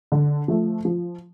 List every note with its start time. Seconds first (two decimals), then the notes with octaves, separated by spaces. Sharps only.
0.12 D3
0.48 F3 A3
0.85 F3